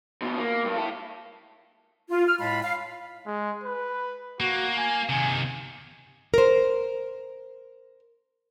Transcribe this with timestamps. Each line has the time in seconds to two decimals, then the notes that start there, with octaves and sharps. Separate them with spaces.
0.22 D2 B2
0.38 A#3
0.65 G2
0.76 E4 A4
2.11 F4
2.28 F6
2.40 A2 G#3 F5 A5 B5
2.64 F5
3.26 G#3
3.64 B4
4.40 A#3 F#4
4.77 G#5
5.09 C3 D#3 G#5
6.34 A#4 C5